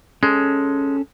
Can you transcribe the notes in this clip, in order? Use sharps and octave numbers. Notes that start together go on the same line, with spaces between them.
G#3 C#4 A4